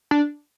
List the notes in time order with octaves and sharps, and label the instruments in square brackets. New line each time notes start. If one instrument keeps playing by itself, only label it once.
[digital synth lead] D4